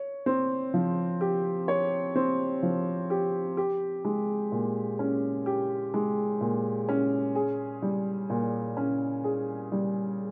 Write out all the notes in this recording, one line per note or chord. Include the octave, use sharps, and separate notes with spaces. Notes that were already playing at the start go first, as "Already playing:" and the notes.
Already playing: C#5
C4
F3
G4
C#5
C4
F3
G4
G4
G#3
A#2
C#4
G4
G#3
A#2
C#4
G#4
G3
A#2
C#4
G#4
G3